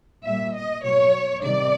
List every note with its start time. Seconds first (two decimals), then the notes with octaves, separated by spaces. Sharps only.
0.25 A#2 G3 E5
0.55 D#5
0.84 B2 F#3 C#5
1.43 C3 D#3 G3 D5